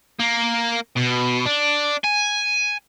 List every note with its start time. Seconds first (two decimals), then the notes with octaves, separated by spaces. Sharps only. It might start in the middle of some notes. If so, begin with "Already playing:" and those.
0.20 A#3
0.97 B2
1.46 D4
2.04 G#5